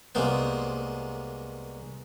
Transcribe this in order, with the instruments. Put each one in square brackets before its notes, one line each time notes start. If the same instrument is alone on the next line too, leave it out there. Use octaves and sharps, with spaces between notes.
[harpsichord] C2 G#3 A#3 B3 C5